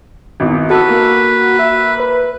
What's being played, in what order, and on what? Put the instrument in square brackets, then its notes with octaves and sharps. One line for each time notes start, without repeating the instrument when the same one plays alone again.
[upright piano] G#1 E2
[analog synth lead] F#4 [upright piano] A4 E6 [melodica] B4
[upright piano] A#3
[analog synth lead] E5
B4